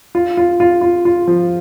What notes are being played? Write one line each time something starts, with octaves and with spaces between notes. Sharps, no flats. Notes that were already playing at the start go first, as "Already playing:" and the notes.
F4
F4
F4
F4
F4
F3